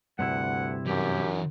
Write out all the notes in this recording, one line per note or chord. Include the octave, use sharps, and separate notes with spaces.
D2 G2 C3 E4 F#5
F#2 E3 G4 A#4